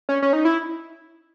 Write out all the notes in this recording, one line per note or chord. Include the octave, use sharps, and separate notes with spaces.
C#4
C#4
D#4
E4